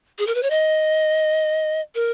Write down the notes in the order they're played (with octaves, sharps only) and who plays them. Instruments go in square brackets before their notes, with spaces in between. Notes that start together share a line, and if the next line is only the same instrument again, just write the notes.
[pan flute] G#4
A#4
B4
C#5
D#5
A#4